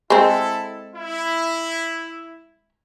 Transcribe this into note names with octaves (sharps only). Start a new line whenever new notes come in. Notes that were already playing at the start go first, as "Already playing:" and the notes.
G#3 C4 E4 A4
E4